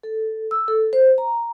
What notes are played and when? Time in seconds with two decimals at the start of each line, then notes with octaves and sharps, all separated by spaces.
0.03 A4
0.51 E6
0.68 A4
0.93 C5
1.18 A#5